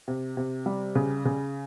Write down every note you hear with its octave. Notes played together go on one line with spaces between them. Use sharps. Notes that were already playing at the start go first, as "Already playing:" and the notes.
C3
C3
G3
C#3
C#3